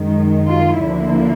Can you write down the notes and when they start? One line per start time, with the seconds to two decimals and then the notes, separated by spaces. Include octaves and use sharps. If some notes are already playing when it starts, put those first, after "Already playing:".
Already playing: F#2 D#3 G#3
0.49 F4
0.80 D2 D3 F3 A#3 E4